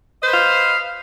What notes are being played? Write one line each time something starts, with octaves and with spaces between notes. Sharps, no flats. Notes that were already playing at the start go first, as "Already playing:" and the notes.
B4 C5 D#5 F5